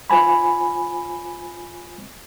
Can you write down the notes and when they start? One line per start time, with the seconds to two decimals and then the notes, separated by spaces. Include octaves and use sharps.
0.10 F4 C5 G#5 B5